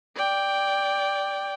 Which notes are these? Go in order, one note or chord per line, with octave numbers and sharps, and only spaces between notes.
D5 G5